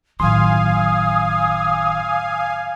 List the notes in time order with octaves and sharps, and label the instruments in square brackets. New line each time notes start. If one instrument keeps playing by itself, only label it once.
[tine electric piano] G1 D#3 C6 [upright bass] A2 F#3 [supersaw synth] F5 G#5 [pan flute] D#6